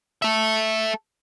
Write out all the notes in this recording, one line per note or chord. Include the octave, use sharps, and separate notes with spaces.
A4 E5